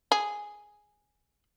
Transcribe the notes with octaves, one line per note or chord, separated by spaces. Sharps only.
G#4